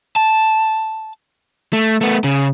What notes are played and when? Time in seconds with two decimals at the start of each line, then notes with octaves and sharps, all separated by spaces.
0.16 A5
1.73 A3
2.01 A3 B3
2.24 C#3